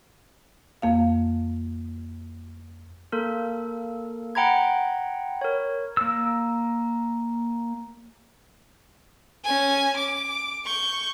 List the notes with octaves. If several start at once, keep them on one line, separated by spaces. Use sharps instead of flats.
F2 A#3 F5
A#3 A4 A#4
F#5 G5 A#5 B5 G#6
A#4 C#5
A#3 E6
C#4 G#5
D6
C#6 G6